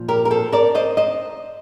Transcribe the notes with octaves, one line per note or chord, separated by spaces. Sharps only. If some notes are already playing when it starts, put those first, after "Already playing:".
Already playing: A#2 F3
G4 A#4
A#4
A4 C5
A#4 D5
C5 D#5
C5 D#5